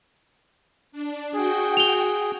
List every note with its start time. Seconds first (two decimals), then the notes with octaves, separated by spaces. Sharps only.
0.92 D4
1.33 F#4 G#4 G5
1.77 F7 G7